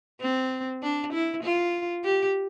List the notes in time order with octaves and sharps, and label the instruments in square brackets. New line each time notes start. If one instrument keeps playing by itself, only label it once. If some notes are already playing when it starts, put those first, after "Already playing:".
[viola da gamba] C4
D4
E4
F4
G4